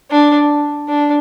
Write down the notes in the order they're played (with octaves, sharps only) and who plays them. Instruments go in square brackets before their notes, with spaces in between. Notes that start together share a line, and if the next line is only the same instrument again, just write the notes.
[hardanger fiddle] D4
D4